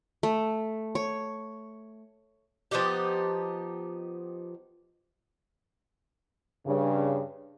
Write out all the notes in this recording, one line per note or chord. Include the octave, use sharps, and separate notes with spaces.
A3
C#5
F3 B3 D#4 G4
G2 C#3